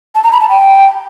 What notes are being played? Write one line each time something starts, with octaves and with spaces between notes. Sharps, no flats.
A5
A#5
B5
A5
G5